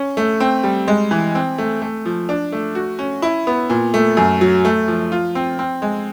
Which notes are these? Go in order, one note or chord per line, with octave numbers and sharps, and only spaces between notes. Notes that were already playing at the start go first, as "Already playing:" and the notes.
Already playing: C#4
A3
C4
G3
G#3
E3
C4
A3
A3
F3
D4
A3
F#4
C#4
E4
B3
A#2
A3
F#2
F#3
A3
F3
F4
C4
C4
G#3